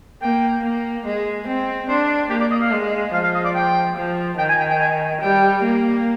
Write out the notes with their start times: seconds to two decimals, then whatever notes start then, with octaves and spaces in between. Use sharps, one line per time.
0.22 A#3 G5
0.64 A#3
1.06 G#3
1.47 C4
1.88 D4 C5
2.30 A#3 G4
2.41 D5
2.51 D#5
2.61 F5
2.71 G#3
3.14 F3 F5
3.24 F5
3.35 D#5
3.45 D5
3.55 G5
3.96 F3
4.38 D#3 G5
4.49 G#5
4.59 G5
4.70 G5
4.80 G#5
5.21 G3 G5
5.63 A#3